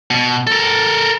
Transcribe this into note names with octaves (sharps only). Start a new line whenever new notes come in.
B2
A4 A#4